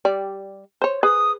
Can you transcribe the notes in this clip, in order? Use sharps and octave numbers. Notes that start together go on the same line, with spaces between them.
G3 D5
C5 C#5
G#4 B4 D#6